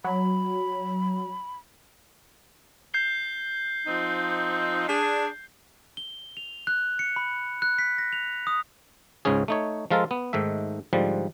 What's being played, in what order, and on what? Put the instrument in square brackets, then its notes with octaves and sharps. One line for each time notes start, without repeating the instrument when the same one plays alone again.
[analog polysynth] F#3 [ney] B5
[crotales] G6 C7 G7
[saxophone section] F3 C4 D#4
D4 G#4
[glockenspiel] G7
F7
F#6
C#7
B5
F#6
B6
A#6
F7
D#6
[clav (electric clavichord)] C#2 G#2 C#3 C#4 G#4
A3 D#4 C#5
F3 G#3 F4 A4 A#4
B3
G#2 D#3 A3 E5
G#2 D3 F3 G3